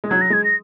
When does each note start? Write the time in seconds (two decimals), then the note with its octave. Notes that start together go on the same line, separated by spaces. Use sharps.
0.04 G#3
0.10 F#3 G#6
0.21 A#6
0.30 G#3 G#6
0.44 A#6